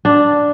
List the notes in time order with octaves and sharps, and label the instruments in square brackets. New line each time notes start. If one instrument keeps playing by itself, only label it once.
[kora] D4